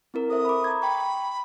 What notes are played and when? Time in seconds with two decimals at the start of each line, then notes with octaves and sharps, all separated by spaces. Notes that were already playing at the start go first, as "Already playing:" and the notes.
0.14 C4 E4 A#4
0.30 A4 C5 E5 D#6
0.45 B5 D6
0.64 A#5 G#6
0.82 G5 B5 C#6